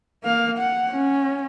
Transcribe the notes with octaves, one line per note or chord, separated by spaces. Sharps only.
A#3 F5
F#5
C#4